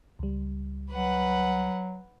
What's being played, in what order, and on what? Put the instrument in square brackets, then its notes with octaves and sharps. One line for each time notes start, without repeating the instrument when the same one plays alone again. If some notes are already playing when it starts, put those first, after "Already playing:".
[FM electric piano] C#2 G3
[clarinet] F#3 [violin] B4 F#5